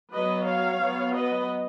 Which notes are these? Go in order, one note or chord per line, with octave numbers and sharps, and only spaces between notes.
F#3 B3 B4 D#5
C#5 F5
F#3 B3
B4 D#5